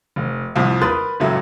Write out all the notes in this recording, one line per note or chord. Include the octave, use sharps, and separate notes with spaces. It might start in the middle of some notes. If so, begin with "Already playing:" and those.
F1
C2 F2
A#4 B4 C6 D#6 F#6 A6
C#2 F#2 A2 F#3 A3